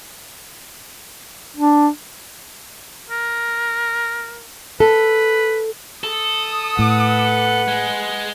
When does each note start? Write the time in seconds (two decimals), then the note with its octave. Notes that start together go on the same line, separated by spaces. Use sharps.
1.57 D4
3.10 A#4
4.80 A4 B4
6.04 A4 D#6
6.79 A2 B4 F#5
7.68 G#3